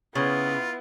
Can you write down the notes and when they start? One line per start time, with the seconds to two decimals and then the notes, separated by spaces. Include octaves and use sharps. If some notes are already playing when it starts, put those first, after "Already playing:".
0.15 C#3 B3 E4 F4